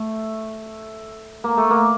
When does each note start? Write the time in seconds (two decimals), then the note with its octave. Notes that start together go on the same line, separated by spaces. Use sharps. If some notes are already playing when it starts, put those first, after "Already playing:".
Already playing: A3
1.44 A#3
1.57 A3
1.71 A#3